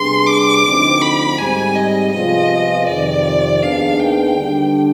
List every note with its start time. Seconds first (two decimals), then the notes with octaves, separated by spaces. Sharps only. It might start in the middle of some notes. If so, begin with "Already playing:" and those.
Already playing: C3 G3 B3 D4 G#4 C6
0.27 D6
0.64 D2 D3 F3 C4 D#4
1.02 B5
1.38 G#2 G3 C4 G#5
1.76 D#5
2.13 C3 F3 B3 F4 G#4 D#5
2.87 F2 C3 D#3 D5
3.62 D#2 D#3 B3 D4 G#4 F5
4.00 G5
4.37 D3 G3 D4